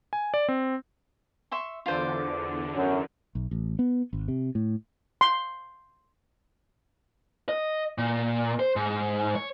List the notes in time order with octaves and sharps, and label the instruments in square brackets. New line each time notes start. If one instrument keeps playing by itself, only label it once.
[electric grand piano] G#5
D5
C4
[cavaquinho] E5 C6 C#6
[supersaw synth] E2 D3 [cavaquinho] F4 C5 D5
[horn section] F#2
[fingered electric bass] B1
A1
B3
G#1
C3
A2
[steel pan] C6
[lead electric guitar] D#5
A#2
C5
G#2
C#5